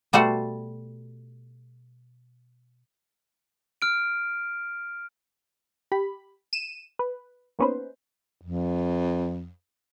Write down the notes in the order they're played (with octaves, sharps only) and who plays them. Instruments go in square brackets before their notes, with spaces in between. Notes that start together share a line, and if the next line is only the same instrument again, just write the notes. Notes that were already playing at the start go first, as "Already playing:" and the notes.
[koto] B2 G3 A3 F#4 C5 F#5
[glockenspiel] F6 D7
[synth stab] G4 B5
D#7 E7
B4
A#3 B3 C#4 D#4 B4 C5
[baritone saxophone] F2